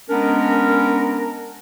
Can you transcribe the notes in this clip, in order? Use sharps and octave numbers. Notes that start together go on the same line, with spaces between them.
G#3 B3 C#4 D4 A#4